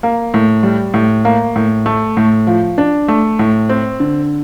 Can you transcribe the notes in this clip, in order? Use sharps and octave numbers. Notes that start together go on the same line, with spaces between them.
A#3
A2
G3
A2
A#3
A2
A3
A2
F3
D4
A3
A2
C4
D3